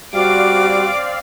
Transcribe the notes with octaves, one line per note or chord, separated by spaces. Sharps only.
G3 C4 F#4 D5 F5 D6